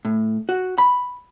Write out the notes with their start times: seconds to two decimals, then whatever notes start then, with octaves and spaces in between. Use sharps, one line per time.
0.05 A2
0.49 F#4
0.78 B5